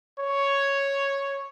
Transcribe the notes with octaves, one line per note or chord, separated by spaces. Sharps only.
C#5